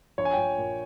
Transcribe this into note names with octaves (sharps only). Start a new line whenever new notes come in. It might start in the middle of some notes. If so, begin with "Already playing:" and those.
A#1 C#5
G#5
A#1 G5
A#2